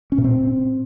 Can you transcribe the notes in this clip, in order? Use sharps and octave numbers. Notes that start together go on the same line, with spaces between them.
C#4
A#2
C4